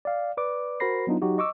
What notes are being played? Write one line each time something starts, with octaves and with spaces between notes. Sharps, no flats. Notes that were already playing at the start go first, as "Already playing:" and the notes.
D5 F5
B4 D5 D6
F#4 A#4 C5 B5 A#6 C7
F#3 B3 D4 D#4 F4
F#3 D#4 F#4 G4
D#5 C#6 D6 E6